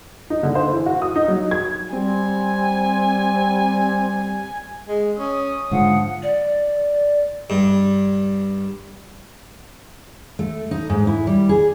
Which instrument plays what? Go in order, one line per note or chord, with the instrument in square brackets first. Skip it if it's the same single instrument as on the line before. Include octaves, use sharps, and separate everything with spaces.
[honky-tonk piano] D#4
D3
C5
E3
F#4
D#6
D#4
F#3
G#6
[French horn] G3 [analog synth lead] C4 [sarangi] G#5
[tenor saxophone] G#3
[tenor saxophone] C#4 [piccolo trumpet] D#6
[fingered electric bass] G#2 D3 G#3 [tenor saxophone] F3 [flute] F#5
[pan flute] D5
[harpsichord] G2
[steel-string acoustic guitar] A3
D#4
G#2
E4
G3
G#4